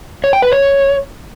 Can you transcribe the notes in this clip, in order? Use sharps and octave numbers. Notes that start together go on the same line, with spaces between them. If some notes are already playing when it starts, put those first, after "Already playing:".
C#5
G5
B4
C#5